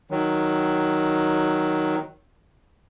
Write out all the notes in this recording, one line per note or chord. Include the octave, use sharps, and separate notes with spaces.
D#3 F#3